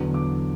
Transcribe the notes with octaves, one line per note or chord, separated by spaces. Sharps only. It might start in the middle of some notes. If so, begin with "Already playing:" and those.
Already playing: E2 D3 F#3
D6